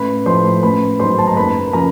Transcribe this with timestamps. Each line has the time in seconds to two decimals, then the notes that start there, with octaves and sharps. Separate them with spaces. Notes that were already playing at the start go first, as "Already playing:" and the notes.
Already playing: A1 B4 B5
0.26 A2 F3 C5 C6
0.63 A1 B4 B5
1.00 G#2 D#3 F#3 C5 C6
1.18 A5
1.27 A#5
1.36 F#1 B4 B5
1.73 C#3 F3 A#4 A#5